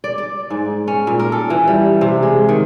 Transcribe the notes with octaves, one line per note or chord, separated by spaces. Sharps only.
D5
D5
G#2
C#4
A#2
A#4
A4
E3
G3
C3
G#3
D#3